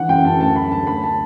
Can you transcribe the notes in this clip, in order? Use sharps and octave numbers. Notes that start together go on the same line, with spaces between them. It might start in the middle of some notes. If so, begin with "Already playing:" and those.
Already playing: D3 E3 F#5
F#2 G5
F#2 A5
D2 A5
F#3 B5
D2 A5
D2 B5
A5